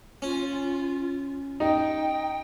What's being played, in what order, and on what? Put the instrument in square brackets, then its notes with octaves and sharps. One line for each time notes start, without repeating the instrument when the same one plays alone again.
[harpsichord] C#4 [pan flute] F4
[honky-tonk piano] D#4 [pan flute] G5